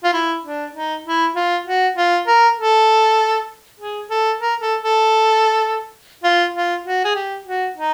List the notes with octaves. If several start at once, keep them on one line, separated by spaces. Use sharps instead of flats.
F4
E4
D4
D#4
E4
F4
F#4
F4
A#4
A4
G#4
A4
A#4
A4
A4
F4
F4
F#4
G#4
G4
F#4
D#4